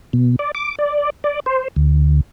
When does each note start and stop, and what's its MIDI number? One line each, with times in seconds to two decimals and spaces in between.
0.13 0.36 47
0.39 0.51 74
0.55 0.75 86
0.79 1.10 74
1.24 1.40 74
1.46 1.68 72
1.76 2.21 38